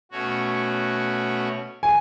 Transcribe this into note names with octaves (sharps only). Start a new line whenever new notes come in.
B2 A3 C#4 F#4 C#5
G#5